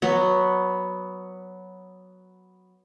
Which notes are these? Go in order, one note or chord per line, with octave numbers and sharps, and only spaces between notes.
F#3 B3